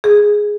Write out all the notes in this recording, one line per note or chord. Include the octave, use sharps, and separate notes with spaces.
G#4